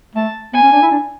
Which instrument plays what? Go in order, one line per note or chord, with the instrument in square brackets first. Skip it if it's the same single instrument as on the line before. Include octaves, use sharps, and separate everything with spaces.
[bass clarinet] A3 [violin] A5
[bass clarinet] B3 [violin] G#5
[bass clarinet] C#4
D4
E4
D4